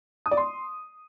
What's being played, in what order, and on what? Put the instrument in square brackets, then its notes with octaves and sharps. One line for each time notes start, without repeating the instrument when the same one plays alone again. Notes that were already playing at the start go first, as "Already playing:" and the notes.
[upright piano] D#6
D5
C6